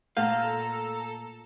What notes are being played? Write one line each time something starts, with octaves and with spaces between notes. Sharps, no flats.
A#2 A3 A4 F5 A#5